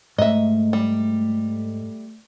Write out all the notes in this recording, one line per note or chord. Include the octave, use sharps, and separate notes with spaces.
G#2 A3 D#5 E5
G3